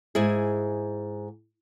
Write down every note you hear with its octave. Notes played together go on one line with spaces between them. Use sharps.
G#2 E4 G#4